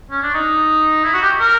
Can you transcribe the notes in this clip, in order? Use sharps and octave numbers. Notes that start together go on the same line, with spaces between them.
C#4
D4
D#4
E4
F#4
G4
A#4